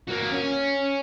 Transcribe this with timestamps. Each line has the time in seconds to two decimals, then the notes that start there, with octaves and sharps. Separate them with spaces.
0.09 A#3 F#4
0.32 C#4